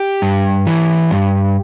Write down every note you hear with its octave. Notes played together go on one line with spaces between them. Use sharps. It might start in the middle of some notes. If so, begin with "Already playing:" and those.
Already playing: G4
G2
E3
G2